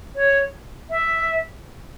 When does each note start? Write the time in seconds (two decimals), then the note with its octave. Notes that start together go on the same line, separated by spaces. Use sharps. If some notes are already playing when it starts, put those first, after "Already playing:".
0.15 C#5
0.90 E5